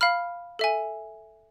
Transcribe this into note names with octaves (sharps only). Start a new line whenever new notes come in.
F5 B5 F6
A4 E5 G#5